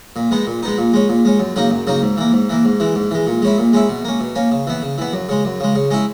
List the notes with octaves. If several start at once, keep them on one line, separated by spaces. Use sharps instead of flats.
A#2
G#3 B3 D#4
A#2
G#3 B3 D#4
A#2
G#3 C#4
A#2
G#3 C#4
F#2
C#3 F#3 A#3 D#4
F#2
C#3 F#3 A#3 D#4
G#2
E3 A#3
G#2
E3 A#3
G#2
E3 G#3
G#2
E3 G#3
A#2
G#3 C#4 E4
A#2
G#3 C#4 E4
B2
A#3 C#4
B2
A#3 C#4
C#3
E3 B3
C#3
E3 B3
F#2
C#3 G#3
F#2
C#3 G#3
C#3
G#3 C#4 E4